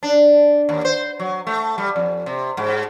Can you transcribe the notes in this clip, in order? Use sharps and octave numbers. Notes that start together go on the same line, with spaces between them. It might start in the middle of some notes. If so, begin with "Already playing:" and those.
D4
D#2
C5
F#3
A3
G3
F2
C3
G#2